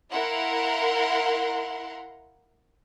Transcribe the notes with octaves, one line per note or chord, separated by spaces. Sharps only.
E4 A#4 F5 F#5 A#5 C6